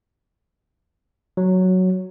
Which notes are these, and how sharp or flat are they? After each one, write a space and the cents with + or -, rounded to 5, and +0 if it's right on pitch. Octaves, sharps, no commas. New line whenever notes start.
F#3 +0